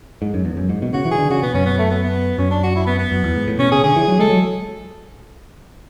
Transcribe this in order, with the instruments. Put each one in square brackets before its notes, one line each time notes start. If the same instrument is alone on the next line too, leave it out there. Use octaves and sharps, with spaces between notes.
[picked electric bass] G#2
F#2
E2
F#2
G#2
B2
[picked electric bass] C#3 [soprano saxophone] F#4
[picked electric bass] E3
[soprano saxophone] G#4
[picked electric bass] D3
[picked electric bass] C#3 [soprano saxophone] F#4
[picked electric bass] B2 [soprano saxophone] B3
[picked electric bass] F#2 [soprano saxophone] C#4
[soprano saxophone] B3
A3
B3
B3
[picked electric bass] F#2 [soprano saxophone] C#4
[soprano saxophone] D4
F#4
E4
B3
B3
[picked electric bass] F#2
E2
G#2
A2
[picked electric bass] B2 [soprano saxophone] C#4
[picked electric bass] C#3 [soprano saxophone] G#4
[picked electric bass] D3 [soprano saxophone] G#4
[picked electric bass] E3
F#3
[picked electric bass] G#3 [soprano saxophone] A4
[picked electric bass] F#3